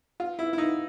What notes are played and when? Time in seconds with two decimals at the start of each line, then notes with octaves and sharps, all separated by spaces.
0.20 F4
0.39 E4
0.53 E4
0.58 D#4